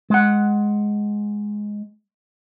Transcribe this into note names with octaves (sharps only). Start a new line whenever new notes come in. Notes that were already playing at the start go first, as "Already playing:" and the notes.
G#3 F#5